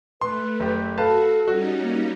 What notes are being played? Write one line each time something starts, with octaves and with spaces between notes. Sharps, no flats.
A3 B4 C6
F#1 G4
F#4 A4 B4 F5 A5
G3 C#4 D#4 F#4
A#3